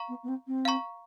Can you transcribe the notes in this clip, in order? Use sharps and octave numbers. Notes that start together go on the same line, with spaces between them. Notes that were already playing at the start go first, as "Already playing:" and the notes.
Already playing: F5 A#5 C#6
B3
B3
C4
C4
F5 A#5 C#6